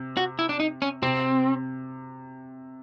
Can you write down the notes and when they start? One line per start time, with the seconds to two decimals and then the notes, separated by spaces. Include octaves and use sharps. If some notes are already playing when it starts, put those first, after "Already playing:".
Already playing: C3
0.17 F#4
0.39 E4
0.49 D4
0.60 D#4
0.82 C#4
1.02 C3 C4